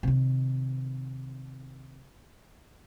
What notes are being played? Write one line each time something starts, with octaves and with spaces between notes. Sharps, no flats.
C3 D#3